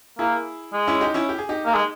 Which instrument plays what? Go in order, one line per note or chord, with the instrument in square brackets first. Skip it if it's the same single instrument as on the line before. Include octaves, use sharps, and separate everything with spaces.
[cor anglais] A#3 [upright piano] E4 G#4
[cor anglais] G#3
[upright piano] C#4 E4
D#4 G4
C#4 E4
G4
G#4
D#4 G4
[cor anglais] A#3
G#3